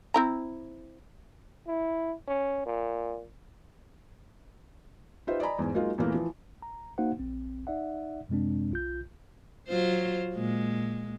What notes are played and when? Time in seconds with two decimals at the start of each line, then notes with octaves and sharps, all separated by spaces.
0.14 C4 E4 A#5
1.67 E4
2.27 C#4
2.66 A#2
5.27 D#4 F4 G4 B4 C5 E5
5.40 D5 D#5 G#5 A#5 B5
5.59 E2 G#2 G#5
5.74 F#3 G#3 A#3 D#4 F4 F5
5.98 E2 A#2 E3 A3 A#3 A#4
6.14 E3 F3
6.62 A#5
6.98 A#3 D#4 F#4 C5 F5 F#5
7.19 A#1 C4
7.67 D#4 D5 E5 F#5
8.29 F#2 C3 G#3 C4 D4
8.71 B1 F4 G6
9.69 F#3 F4 C5
10.35 A#2 G#3